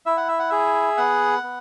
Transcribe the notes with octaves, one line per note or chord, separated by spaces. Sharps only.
E4 E5
F#5
E5
F#5
G#4 E5
B3 F#5
B3